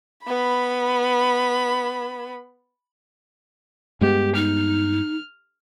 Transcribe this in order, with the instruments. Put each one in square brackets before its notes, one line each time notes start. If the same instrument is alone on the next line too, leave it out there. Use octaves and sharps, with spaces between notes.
[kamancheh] B3 B5
[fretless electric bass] G2 G#3 B3 [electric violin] G4
[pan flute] D#4 [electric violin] F6